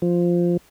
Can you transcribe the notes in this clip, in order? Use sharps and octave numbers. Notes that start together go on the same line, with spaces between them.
F3